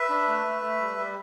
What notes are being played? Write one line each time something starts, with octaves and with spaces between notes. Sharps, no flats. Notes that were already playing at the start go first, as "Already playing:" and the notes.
Already playing: B4 E5
D4
A3
A3
A3
G3
G3